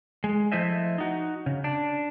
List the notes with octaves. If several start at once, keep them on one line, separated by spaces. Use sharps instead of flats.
G#3
F3 A3 E4 C5 D#5 E5
D#4 F#4
C#3
D4